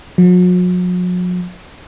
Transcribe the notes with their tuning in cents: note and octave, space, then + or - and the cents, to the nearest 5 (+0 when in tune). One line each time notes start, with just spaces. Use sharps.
F#3 -45